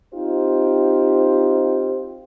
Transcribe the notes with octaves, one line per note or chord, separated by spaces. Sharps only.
C4 D#4 F4 G4 C5